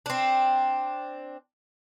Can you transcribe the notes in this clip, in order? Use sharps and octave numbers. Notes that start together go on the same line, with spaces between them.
C4 D4